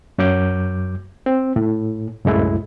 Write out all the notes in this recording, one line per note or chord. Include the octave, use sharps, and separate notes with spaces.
F#2 F#3 D6 G6
C4
A2
C2 F#2 A2 G#3 E4